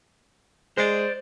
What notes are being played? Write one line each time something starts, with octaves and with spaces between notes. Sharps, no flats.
G#3 C5 D5